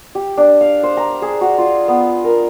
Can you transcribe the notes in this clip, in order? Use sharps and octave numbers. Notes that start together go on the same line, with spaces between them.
G4
D4
F5
C5
A#5
G#4
F#4
F4
B3
A#4